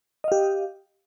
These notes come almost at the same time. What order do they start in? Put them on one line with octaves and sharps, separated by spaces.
D#5 F5 G4